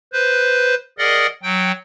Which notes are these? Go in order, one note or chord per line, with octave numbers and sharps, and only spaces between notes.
B4 C5
G#4 A#4 D5 D#5 F#5
F#3 G5